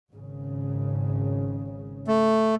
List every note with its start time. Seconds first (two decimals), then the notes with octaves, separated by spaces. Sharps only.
0.10 G#1 C#3
2.08 A3